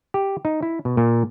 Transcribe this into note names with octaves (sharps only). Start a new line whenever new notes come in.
G4
D#4
E4
B2
A#2